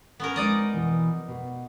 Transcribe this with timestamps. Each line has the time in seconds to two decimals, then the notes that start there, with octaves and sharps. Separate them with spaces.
0.20 B3 C#4 A#4
0.36 G#3 C4 C#4 D#4 D5 D#5
0.74 B2 E3
1.28 B2